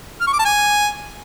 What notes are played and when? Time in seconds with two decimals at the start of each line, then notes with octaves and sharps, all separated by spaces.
0.21 F6
0.27 C#6
0.33 D6
0.39 A5
0.45 G#5